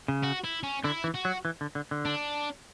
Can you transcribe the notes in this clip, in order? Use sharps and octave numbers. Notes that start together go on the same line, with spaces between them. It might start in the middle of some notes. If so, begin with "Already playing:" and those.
C#3
F#4
E4
C#4
D3 E4
E3
F#4
F#3
E3
D3
D3
D3
D4